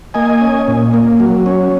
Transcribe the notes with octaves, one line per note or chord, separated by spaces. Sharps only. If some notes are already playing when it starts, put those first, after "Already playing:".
A#3 D#5 G#5
C#4
A#2
A#3
F#3
C#4